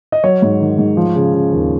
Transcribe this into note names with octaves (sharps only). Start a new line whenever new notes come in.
D#5
F#3 C#5
G#2
D#3
G#2
F3
C#3
C#3
D#2